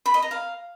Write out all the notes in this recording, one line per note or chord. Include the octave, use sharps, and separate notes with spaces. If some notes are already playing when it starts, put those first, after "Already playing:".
B5
D#5
A#5
F5